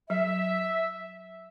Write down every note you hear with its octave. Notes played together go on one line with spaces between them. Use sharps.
F#3 E5